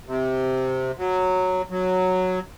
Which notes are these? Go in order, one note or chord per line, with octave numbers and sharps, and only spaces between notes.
C3
F#3
F#3